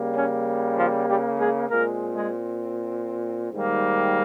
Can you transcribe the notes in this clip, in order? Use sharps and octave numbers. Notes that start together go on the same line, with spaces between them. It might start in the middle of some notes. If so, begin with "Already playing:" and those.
Already playing: C#3 G3 A#3
C#4
F3 F4
G3 G4
G#3 G#4
A#2 G#3 A#3 C4 A#4
G#3 G#4
G#2 D#3 G3 A#3